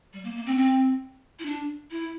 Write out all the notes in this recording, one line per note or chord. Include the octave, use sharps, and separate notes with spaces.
G3
A#3
A#3
C4
C4
E4
D4
E4